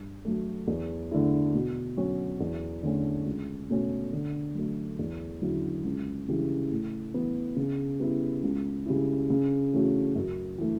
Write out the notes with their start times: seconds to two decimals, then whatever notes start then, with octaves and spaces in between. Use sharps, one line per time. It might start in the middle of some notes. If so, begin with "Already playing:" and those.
Already playing: G2
0.25 F#3 A3
0.67 E2
1.11 D3 A3 E4
1.54 B2
1.97 F#3 C#4 F#4
2.40 E2
2.83 D3 A3 C#4
3.26 C#2
3.70 B2 A3 C#4
4.13 D3
4.55 F#3 A3
4.99 E2
5.42 D3 F#3 C#4 E4
5.84 C#2
6.28 C#3 E3 G3
6.71 A2
7.14 E3 B3
7.56 C#3
8.00 G3 B3 E4
8.43 C#2
8.86 C#3 G3 C#4 E4
9.30 C#3
9.72 E3 A3 C#4 F#4
10.15 F#2
10.58 E3 A3